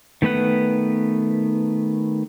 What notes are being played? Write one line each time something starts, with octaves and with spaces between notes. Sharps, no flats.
D#3 A3 B3 B4 F#5